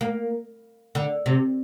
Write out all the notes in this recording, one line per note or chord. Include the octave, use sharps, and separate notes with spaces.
A#3
D3
C3